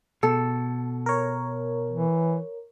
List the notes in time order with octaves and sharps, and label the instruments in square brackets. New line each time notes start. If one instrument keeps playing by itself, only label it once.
[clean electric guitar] B2 [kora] A4
[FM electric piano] A#4 C#5
[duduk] E3